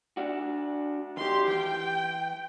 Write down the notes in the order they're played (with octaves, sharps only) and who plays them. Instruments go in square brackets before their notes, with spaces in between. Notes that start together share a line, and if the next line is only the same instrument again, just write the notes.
[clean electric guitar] D4 F#4
[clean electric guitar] D#3 F#4 [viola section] G4 C6
[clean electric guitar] E3 C6 [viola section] G5